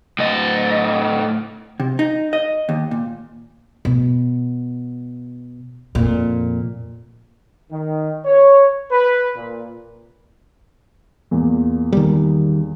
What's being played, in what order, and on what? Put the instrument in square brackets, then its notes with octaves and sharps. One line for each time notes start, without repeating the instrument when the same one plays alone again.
[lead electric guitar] A2 D#5
[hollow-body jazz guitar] C3
D#4
D#5
D#2
A#2
[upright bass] B2
F2 A#2
[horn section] D#3
C#5
B4
A#2
[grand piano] E2 A#2
[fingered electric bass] D#3 G3